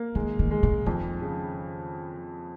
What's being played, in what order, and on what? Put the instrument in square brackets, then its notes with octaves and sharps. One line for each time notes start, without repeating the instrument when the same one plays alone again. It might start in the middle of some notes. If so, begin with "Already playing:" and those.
Already playing: [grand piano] A#3
[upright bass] D#3 [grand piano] G#3
[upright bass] D#3
[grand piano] G#3
[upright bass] C#3
[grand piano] F2 [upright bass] D#3
[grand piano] C#3